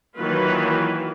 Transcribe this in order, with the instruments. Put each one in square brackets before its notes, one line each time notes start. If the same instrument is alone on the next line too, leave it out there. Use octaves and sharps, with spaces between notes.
[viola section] D#3 E3 F#3 A#3 F4 B4